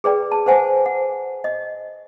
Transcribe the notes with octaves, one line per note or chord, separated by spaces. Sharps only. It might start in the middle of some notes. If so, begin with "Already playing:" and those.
G#4 B4 D5 G5
A5
B4 C5 F#5 G#5
F#5
D#5